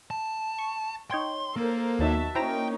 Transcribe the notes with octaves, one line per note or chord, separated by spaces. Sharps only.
A5
C#6
D#4 C#5 G5 C6
A#3 A4 A#4 C5
D#2 F#3 D#4 F#4 E5 A5
A#3 C#4 D#4 E4 C5 G5 A#5